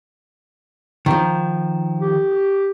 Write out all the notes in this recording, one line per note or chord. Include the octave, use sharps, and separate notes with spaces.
D#3 F3
G4